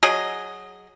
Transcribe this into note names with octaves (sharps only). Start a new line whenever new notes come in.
F#3 G#4 D#5